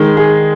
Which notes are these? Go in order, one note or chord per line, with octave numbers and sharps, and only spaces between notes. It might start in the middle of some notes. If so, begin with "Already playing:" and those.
Already playing: D#3 G#3
G#4